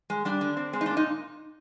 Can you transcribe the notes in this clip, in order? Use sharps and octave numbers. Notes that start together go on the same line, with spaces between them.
G#3
G3 D4
D3
C4
G#3 C4
D#4
A#2 D4
D#4